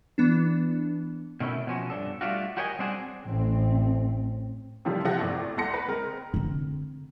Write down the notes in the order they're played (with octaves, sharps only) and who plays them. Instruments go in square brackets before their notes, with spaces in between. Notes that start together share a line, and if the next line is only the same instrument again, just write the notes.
[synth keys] E3 B3 D4
[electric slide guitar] B2 D#3 A3 C#4 E4
B2 F3 C#4 F#4
G2 C3 D4 A4
G3 A3 D4 F4 F#4
F#4 G4 A#4 C#5 D#5 G#5
G3 C4 D4 F#4 G#4
[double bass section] A1 A3 C4
[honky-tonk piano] C3 D#3 F3 G3
C3 F3 F4 G4 F#5 A#6
G#1 A2 D5
C2 A4 F#5 C6 A#6 C#7
B4
G#3 C4 A#4
[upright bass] D3 C4